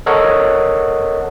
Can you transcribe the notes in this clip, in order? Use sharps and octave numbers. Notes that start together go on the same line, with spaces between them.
A4 A#4 C#5 D#5 F#5